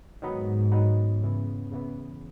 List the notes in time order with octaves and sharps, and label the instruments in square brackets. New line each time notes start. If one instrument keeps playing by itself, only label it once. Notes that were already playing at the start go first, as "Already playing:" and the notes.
[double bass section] G#2 [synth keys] D#3 F#3 B3 D#4
[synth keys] D#3 F#3 B3 D#4
E2 C#3 E3 B3
E2 C#3 E3 B3